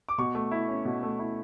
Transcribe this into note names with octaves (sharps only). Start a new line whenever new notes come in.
D6
B2 C#6
A3
E4
C#4
B2
A3
E4